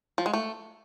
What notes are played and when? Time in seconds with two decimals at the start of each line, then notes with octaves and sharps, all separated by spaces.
0.18 F3
0.26 G#3
0.34 A3